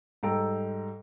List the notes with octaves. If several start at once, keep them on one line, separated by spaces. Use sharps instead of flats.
G#2 G3 A4 G5 A#5 D7